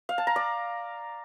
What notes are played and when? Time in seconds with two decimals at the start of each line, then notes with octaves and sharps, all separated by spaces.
0.09 F5
0.18 A5
0.27 A#5
0.36 D5